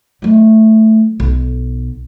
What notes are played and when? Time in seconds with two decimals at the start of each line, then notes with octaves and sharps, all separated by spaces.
0.22 F#3 A3
1.20 B1